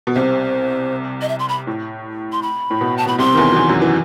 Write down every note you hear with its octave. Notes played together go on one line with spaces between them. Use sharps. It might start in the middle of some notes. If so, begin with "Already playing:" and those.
B2
C2 C3 C5
D#5
E5
C6
B5
A2
C6
B5
A2
B2
A5
B2 B5
C2 C3 C6
D#3
E2 E3
F#3
E2 E3
F#2 F#3
E3